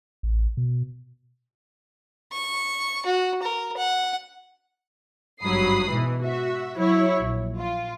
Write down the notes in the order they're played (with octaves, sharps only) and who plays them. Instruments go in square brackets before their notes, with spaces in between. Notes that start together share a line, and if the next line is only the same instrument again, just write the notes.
[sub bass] A1
B2
[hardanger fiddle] C#6
F#4
A#4
F#5
[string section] G#1 G2 F#3 B5 D#6 C7
G#2 B2 E3
F#4 E5
F#3 E4 C#5
A#1
F4